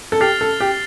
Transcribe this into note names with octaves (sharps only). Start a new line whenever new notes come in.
A4
G4 F6 A6 C7 F7
A4
G4